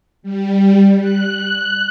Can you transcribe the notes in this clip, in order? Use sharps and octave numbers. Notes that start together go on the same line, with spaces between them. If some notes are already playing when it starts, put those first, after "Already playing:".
G3
F#6